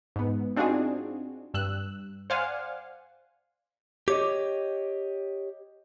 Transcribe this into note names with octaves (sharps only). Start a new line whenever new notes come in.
G#2 B3
C4 D4 D#4 F4 F#4 G#4
G2 E6 F#6
C5 D5 F5 F#5 G#5
G4 C#5 D#5 D6